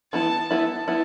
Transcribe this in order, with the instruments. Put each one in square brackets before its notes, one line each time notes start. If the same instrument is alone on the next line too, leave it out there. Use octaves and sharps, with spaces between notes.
[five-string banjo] E3 B3 E4 [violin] A5
[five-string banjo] E3 B3 E4 [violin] A5
[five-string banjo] B3 E4